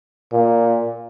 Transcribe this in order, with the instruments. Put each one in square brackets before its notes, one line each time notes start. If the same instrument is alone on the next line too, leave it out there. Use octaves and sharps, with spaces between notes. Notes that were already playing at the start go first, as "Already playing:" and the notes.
[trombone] A#2